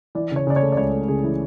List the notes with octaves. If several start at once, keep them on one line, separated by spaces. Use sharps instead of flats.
E3 D5
C#3 C#5
C#3 D5
C#5
A3
D5
C#2 C#5
A3
C#3 G#4
E3